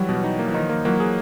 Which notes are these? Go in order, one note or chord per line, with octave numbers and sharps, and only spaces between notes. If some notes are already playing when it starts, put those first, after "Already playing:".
Already playing: E3 F#3 G3
B2
D#4
A#3
E3
D#3 F3 D#4
A#3
E3 F#3 A#3
G#4